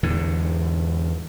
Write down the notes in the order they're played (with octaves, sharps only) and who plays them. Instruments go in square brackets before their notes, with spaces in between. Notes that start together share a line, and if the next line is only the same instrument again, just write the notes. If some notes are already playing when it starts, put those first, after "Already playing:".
[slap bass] E2 G#2 D3